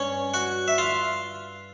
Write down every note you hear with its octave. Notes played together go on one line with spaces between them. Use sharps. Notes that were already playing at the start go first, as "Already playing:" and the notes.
Already playing: G2 G3 C#4 C#5
F#4 F#5
E5
F4 F5